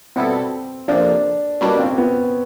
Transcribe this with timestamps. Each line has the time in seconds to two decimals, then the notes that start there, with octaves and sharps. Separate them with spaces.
0.16 B2 G3 B3 C4 E4 A4
0.88 F2 C3 F3 A#3 D4
1.61 B2 G3 A#3 C#4 D4
1.79 C4
1.98 B3